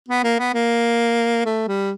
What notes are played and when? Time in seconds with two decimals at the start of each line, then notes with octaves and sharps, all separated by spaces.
0.08 B3
0.23 A#3
0.39 B3
0.54 A#3
1.45 A3
1.68 G3